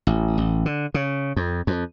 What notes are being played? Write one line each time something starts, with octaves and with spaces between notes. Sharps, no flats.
A1
A1
D3
C#3
F2
F2